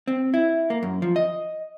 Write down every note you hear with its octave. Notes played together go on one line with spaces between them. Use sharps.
C4
E4
A#3
F#2
F3
D#5